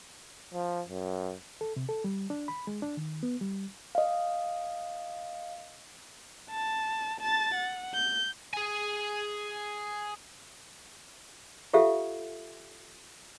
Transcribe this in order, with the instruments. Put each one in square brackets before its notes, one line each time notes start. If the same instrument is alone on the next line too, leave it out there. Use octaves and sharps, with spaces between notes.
[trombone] F3
F#2
[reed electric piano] A4
C3
A4
G3
D4
B5
G#3
D4
D#3
B3
G3
[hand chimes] D#5 F5
[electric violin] A5
A5 A6
F#5
G6
[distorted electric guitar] G#4 G#5
[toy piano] F4 G4 A4 E5 F5